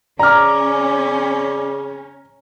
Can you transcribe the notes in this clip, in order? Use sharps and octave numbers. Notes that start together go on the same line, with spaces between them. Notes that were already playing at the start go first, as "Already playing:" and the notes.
C#3 C#4 D5 A#5 D6 F6